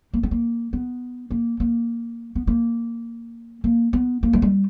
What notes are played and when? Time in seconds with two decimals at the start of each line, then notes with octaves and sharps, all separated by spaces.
0.14 A#3
0.23 B3
0.31 A#3
0.73 B3
1.31 A#3
1.60 A#3
2.35 B3
2.47 A#3
3.64 A#3
3.93 B3
4.23 A#3
4.33 F#3
4.42 G3